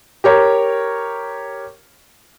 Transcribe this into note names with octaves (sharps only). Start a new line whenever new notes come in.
G4 A#4 C#5